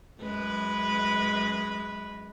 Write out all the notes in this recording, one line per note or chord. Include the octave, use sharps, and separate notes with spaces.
F#2 G#3 B4